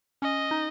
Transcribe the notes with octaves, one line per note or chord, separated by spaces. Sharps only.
C#4 D#5
D#4